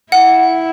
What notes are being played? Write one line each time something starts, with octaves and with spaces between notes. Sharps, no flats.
E4 F#5